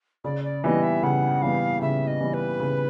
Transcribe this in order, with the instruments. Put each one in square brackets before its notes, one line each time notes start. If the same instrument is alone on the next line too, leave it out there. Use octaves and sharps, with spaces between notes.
[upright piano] C#3 [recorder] D5
[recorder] D5
[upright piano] E3 G3 B3 [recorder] D#5 E5
[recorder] E5
[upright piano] C#3 [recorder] F#5
[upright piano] E3 G3 B3 [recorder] F5
[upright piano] C#3 [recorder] E5
[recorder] D#5
[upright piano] E3 G3 B3
[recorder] B4
[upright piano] C#3